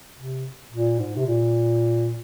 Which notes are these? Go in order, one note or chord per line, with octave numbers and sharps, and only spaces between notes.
C3
A#2
G#2
C3
A#2